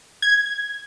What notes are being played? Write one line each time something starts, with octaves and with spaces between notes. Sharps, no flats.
G#6